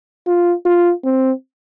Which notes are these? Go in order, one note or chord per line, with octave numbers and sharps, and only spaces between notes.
F4
F4
C4